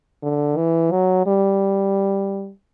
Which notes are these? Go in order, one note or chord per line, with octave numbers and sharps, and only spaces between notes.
D3
E3
F#3
G3